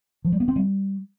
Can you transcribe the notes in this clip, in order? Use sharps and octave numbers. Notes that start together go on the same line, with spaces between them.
F3
G3
B3
C4
G3